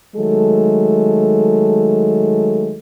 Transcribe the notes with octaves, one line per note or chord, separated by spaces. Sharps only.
D#3 F#3 G#3 A3 A4